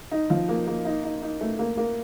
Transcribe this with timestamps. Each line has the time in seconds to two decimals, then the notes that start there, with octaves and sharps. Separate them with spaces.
0.12 D#4
0.30 F3
0.49 A#3
0.67 A#3
0.85 D#4
1.04 D#4
1.22 D#4
1.41 A3
1.59 A#3
1.77 A#3